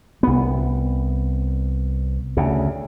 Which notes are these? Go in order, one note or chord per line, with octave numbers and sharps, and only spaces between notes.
C2 B3
D2 C#3